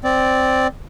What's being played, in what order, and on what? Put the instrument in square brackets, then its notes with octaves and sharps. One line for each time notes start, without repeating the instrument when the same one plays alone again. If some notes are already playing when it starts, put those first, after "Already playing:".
[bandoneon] C4 D5